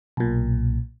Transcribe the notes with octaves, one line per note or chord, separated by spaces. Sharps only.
B1 A#2